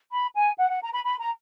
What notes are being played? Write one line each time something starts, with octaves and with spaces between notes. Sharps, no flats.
B5
G#5
F#5
F#5
A#5
B5
B5
A#5